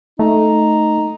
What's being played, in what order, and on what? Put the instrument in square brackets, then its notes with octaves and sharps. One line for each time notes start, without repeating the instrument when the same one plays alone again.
[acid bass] A3 [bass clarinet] D#4